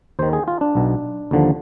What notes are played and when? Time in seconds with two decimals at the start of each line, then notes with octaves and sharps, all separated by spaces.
0.19 D#2 D#3 C5
0.33 G#4
0.48 F4
0.61 D4
0.75 B1 B2
1.31 D#2 D3 F3